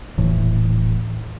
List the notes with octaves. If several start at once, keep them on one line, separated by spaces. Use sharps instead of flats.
D#1 A2 E3